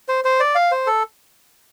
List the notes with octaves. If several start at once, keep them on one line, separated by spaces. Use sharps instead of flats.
C5
C5
D5
F5
C5
A4